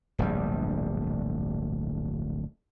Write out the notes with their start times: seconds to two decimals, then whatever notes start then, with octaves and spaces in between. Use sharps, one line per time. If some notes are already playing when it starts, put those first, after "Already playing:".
0.18 D1 A#1 G2 G3